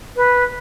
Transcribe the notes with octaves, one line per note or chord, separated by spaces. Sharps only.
B4